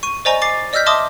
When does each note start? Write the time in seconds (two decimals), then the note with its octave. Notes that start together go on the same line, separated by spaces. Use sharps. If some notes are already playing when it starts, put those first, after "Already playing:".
0.03 C#6 D#7
0.25 C5 D5 D#5 G#5 A#5 C#6
0.42 D6 A6 C7
0.73 D5 D#5 E6 F6 G6 B6
0.86 D#5 E5 A5 C6 D6 D#6